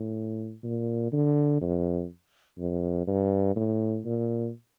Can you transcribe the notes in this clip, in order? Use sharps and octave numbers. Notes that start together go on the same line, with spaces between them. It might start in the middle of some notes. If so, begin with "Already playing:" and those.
Already playing: A2
A#2
D3
F2
F2
G2
A2
A#2